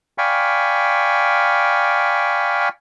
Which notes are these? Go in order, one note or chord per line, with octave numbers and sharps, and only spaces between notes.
D5 F5 G5 G#5 B5 C#6